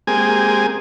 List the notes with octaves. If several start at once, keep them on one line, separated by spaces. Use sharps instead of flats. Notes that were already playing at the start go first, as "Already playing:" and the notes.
G#3 A#3 C4 G4 G#4 G#5